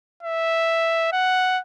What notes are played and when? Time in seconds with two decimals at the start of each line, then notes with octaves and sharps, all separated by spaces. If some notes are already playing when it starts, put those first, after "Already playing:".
0.23 E5
1.13 F#5